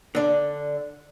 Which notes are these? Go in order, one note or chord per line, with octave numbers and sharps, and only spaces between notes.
D3 D4